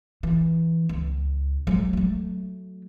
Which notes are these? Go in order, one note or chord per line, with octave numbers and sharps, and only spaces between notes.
E3
C#2
F#3 G#3
F#3 A3